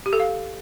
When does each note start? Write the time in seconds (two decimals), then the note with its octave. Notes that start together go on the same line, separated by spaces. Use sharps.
0.06 G4
0.13 A4
0.20 F5